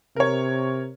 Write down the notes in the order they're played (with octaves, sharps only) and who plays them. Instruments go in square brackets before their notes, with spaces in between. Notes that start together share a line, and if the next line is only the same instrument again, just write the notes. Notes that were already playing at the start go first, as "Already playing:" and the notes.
[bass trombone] C3 [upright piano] A#4 C#5